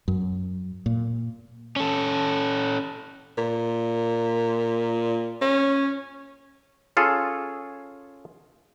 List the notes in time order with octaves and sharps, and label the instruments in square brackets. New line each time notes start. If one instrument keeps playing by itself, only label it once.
[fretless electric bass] F#2
A#2
[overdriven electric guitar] C#4 A4
[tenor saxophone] A#2
C#4
[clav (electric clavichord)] C#4 F4 G#4 A4